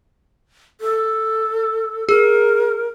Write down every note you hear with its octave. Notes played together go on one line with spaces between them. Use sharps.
A4
G#4 A#4